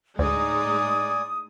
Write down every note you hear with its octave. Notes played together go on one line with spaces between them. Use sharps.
D2 A2 G#3 D#4 D5 G#5 D#6